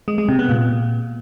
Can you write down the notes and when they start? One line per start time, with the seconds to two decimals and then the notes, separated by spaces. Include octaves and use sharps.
0.08 G#3
0.18 G#3
0.28 C3
0.39 B3
0.49 A#2